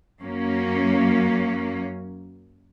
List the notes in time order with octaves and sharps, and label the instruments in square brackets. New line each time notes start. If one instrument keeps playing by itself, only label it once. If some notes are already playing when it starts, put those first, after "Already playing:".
[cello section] F#2 F#3 A#3 C#4